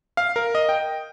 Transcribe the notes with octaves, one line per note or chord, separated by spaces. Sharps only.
F5
A#4
D#5
G5